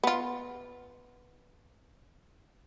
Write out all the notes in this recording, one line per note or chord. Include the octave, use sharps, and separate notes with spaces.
B3 F4